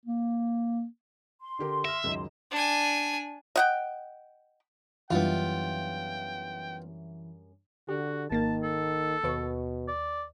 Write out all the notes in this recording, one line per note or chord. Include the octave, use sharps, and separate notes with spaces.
A#3
C6
D3 G4 A#4
E5 F6 A#6
C#2 F#2 D#3
D4 G#5
D#5 F#5 G5
F#2 E3 G3 B3 D4 F4 G5
D3 F#4 G4
G#1 D#3 A#3 A5 A6
A4
D#2 B2 B4 C#6
D5